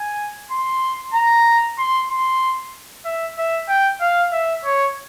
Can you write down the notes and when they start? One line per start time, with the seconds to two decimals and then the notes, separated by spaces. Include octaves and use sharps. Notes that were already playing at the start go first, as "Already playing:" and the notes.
Already playing: G#5
0.51 C6
1.14 A#5
1.78 C6
2.09 C6
3.05 E5
3.38 E5
3.69 G5
4.01 F5
4.32 E5
4.65 C#5